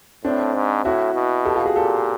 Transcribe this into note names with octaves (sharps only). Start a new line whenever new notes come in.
A2 C4 D4
G#2
A2 E4 F#4
B2
G4 A4
F4 G4
F#4 G#4
A#2 G4 A4